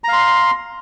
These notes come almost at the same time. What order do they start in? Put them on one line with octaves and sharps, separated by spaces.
A#5 F5 C6